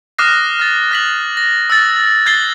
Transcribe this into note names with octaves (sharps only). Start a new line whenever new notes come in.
D6 D#6 F6 F#6 A#6 C7
F6 A6
F#6 B6 F#7
A#6
E6 F#6 A6
F#6 G#6 A6 C7 G7